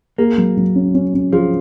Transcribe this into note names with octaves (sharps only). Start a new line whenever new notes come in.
A#3 G#4
F#3
F#3
C#4
C#4
C#4
F3 G#4